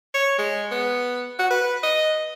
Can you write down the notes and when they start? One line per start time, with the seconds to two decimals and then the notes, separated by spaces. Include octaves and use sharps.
0.14 C#5
0.38 G#3
0.71 B3
1.39 F#4
1.50 B4
1.83 D#5